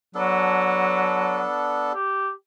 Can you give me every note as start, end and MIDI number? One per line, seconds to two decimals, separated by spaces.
0.15 1.43 54
0.15 1.93 59
0.15 1.93 62
0.15 1.93 69
1.94 2.30 67